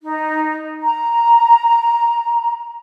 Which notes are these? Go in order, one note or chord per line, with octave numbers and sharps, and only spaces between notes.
D#4
A#5